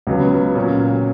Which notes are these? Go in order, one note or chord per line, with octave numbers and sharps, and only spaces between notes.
C#2 C#3 F#3 B3
A#2 F#3 C#4